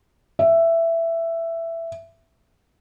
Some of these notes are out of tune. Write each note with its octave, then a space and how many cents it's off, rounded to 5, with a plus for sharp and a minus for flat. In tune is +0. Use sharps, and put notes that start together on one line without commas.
E5 +10